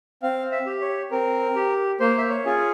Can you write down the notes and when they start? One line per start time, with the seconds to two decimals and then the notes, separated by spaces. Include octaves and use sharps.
0.23 C4 F5
0.52 E5
0.66 G4
0.81 C#5
1.11 C4 A#4
1.56 G4
2.00 A#3 C5
2.18 E5
2.29 C#5
2.45 C#4 F4 G#4